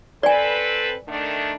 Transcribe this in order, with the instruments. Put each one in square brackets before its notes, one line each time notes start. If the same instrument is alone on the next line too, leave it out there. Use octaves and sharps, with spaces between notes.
[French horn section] C4 A4 B4 [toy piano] D5 G#5
[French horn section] D#3 A3 D4